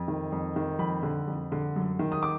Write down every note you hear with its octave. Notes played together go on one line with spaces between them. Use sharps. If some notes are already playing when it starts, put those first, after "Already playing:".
Already playing: F2
D#3
F2
D#3
F2 B5
D3
F2
D3
F#2
D#3
D#6
D6